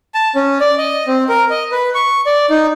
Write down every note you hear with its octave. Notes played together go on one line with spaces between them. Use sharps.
A5
C#4
D5
D#5
C4
A#4
D#5
B4
C#6
D5
D#4